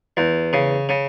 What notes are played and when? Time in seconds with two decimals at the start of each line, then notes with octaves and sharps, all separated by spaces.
0.17 E2
0.53 C#3
0.89 C#3